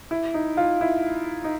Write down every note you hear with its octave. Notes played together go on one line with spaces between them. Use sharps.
E4
D#4
F4
E4
D#4